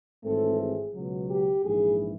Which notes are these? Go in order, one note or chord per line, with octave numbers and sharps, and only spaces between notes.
G#1 G#2 E3 A3 C4 A4
G#4
C#2 B2 F#3
G4
A#1 G#2 E3 G#4